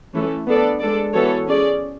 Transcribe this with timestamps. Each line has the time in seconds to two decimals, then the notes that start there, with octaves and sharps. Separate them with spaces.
0.13 E3 A3 C#4 E4 A4
0.47 B3 D4 A4 D5
0.80 G#3 D4 A4 D5
1.14 E3 B3 F#4 A4 C#5
1.47 C#4 G#4 D5